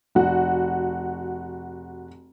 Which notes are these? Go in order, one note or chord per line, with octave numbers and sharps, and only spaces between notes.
F1 F#4